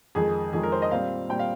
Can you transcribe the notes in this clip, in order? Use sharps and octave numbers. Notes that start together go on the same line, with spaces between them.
F2 D#3 G#3 G#4
F2 D#3 G#3 G#4
A#4
C5
D#5
A#2 G3 C4 F5
A#2 G3 C4 G5
F5